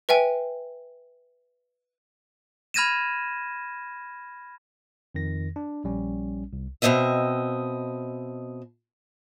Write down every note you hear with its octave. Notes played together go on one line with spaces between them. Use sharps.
B4 E5 G5 G#5
B5 F6 G#6 A#6 D#7 E7
F2 D#3 A#6
D4
A#1 G3 C#4
C2
B2 G#3 C4 D#5 E5